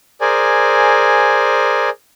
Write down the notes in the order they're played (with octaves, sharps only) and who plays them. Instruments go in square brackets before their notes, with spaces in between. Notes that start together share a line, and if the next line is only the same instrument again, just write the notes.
[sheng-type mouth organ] G#4 A#4 C5 D5 G#5